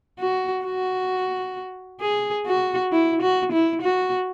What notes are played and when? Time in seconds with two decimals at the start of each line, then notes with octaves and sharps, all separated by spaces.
0.20 F#4
0.65 F#4
2.01 G#4
2.46 F#4
2.92 E4
3.22 F#4
3.52 E4
3.82 F#4